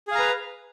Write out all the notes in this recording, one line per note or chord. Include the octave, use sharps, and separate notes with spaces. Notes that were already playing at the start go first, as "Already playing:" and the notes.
G#4 B4 F5 A#5